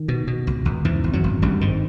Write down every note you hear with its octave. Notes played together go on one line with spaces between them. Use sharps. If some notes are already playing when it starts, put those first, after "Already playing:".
Already playing: D#3
B2
B2
C#2
C#2
E2 G#2 E3
G#1
F#2 F#3
G#1
G#1 G2 G3
G#2 D#3